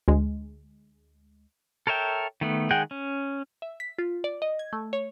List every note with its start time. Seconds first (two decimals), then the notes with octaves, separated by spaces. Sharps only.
0.08 D2 G#3
1.87 A4 A#4 C#5 E5 G5
2.41 D#3 A3 B3
2.71 D#3 G#3 G#4 F#5 G5
2.91 C#4
3.62 E5
3.80 B6
3.99 F4
4.24 D5
4.42 D#5
4.59 G#6
4.73 A3
4.93 C#5